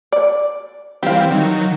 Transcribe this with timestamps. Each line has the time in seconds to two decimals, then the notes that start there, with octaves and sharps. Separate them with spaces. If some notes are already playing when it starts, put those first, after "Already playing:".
0.12 D5
1.03 E3 G3 C4 G4 F5
1.31 D#3 F#3